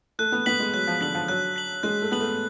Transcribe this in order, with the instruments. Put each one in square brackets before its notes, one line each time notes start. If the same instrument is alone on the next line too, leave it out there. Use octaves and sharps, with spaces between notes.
[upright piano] A3 [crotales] F#6
[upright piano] B3
[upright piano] B3 [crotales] B6 F#7
[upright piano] G#3
[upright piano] F#3 [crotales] F#6
[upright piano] F3
[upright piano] D3 [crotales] B6 F#7
[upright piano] F3
[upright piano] F#3 [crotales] F#6
[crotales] B6 F#7
[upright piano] G#3 [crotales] F#6
[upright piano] A3
[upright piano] B3 [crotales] B6 F#7
[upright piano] A3